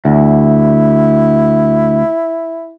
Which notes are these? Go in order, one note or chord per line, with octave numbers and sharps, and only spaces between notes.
D2 E4